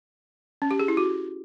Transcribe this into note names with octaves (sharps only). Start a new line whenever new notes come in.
C#4
G4
G#4
E4
F#4